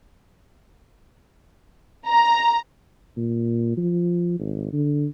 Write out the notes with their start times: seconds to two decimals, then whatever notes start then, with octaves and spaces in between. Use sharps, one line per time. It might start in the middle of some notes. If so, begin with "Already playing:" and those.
2.07 A#5
3.17 A#2
3.77 F3
4.39 G#1
4.73 D3